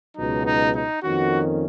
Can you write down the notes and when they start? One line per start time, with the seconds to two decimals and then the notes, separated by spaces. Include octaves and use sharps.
0.16 C#2 B2 F#3 D#4
0.46 D#4
0.74 D#4
1.03 F2 D#3 A#3 C#4 F#4